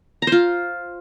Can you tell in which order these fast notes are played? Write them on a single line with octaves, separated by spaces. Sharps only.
A#5 C5 F4